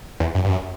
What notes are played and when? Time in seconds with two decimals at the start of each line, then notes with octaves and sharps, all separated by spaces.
0.20 E2
0.35 F#2
0.44 G2
0.50 F#2